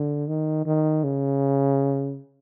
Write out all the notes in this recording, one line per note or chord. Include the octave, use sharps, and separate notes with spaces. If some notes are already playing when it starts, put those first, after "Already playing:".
Already playing: D3
D#3
D#3
C#3